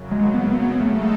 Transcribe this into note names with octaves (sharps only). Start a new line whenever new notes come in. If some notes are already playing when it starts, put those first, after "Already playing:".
Already playing: F#2 C#3 F#3
G#3
B3
B3
C#3 G#3 A3 D#4 A4